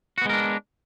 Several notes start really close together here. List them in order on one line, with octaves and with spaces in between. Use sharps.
F#4 B3 G#3 A#4 D4